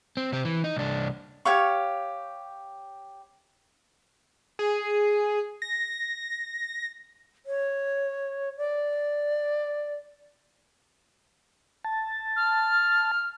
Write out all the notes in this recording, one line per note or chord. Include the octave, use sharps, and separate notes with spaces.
C4
C3 C4
E3
D#4
C2 D4
G4 C#5 F5 C#6
G#4
A#6
C#5
D5
A5
F6